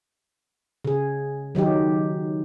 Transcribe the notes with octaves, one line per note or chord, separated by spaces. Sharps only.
C#3 G#4
D#3 F#3 D#4 G4